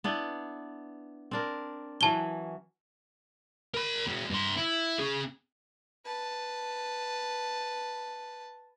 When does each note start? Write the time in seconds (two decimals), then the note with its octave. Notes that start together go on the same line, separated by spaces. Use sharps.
0.04 B3 D4 E4
1.31 C4 D4 A#4
2.01 E3 F#3 C#4 A5 G7
3.74 A#4 B5
4.08 G#3 F#4
4.31 G2 C6
4.57 E4
4.99 C#4 G#4
6.05 B4 A5